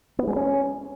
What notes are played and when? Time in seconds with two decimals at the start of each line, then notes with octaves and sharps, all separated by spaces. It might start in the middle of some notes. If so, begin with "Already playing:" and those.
0.19 B3
0.27 G#3
0.36 C#4